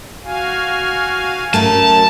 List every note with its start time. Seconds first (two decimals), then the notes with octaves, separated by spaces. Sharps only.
0.24 F#4 F5 G#5
1.54 F#3 A3 C#4 A#4 A5